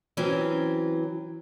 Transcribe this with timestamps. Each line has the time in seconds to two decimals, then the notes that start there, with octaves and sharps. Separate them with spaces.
0.17 E3 F#3 C4 C#4